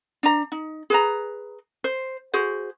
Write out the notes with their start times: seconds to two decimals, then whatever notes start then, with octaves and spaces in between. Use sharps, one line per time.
0.23 D4 A#5
0.52 D#4
0.90 G#4 B4 A#5
1.84 C5
2.34 F#4 G#4 C5